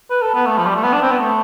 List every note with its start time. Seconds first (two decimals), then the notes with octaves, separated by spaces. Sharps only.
0.10 B4
0.22 A4
0.34 B3
0.46 A3
0.58 F3
0.66 G3
0.75 A3
0.84 B3
0.93 D4
1.02 C4
1.11 B3
1.20 A3